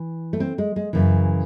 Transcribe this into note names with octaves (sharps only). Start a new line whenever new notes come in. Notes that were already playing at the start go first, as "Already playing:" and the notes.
Already playing: E3
A3
C4
G#3
G#3
F#2 C#3 E3